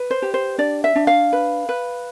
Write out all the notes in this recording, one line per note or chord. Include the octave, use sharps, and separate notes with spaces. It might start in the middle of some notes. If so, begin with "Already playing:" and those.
Already playing: B4
C5
G4
C5
D4 D5
E5
D4
F5
B4
B4